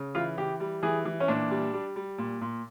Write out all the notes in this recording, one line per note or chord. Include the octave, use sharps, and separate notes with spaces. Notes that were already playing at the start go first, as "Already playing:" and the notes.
Already playing: C#3
E3 F4
E3 G4
G3
E3 G#4
E3
C#4
A#2 D4
G3
G3
G3
A#2
A#2